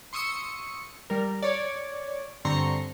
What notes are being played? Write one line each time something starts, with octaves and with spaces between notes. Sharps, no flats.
C6 C#6 D#6 E6 C#7
G3 A#4
C#5 D5
G2 D3 C4 A#5 C6 C#6